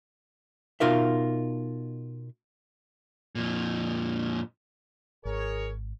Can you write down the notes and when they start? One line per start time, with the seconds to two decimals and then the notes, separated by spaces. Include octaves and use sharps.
0.80 B2 D#4 F4 A#4 E5
3.35 F2 A#2
5.25 G#1 G#4 A#4 C#5